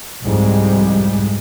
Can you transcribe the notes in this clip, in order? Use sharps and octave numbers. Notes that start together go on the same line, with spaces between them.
C2 F2 G#2 G3 G#3